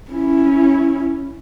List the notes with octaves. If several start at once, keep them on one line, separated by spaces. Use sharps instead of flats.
C#4 E4